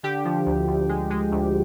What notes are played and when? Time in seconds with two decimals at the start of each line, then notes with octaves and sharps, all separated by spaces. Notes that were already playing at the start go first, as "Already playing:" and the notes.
0.03 D3 G4
0.25 F3
0.46 D2
0.68 D2
0.89 G#3
1.10 G#3
1.32 D2